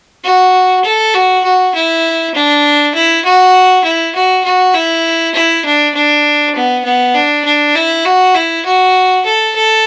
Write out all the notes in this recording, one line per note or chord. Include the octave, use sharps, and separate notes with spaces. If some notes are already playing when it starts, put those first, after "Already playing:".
F#4
A4
F#4
F#4
E4
D4
E4
F#4
E4
F#4
F#4
E4
E4
D4
D4
B3
B3
D4
D4
E4
F#4
E4
F#4
A4
A4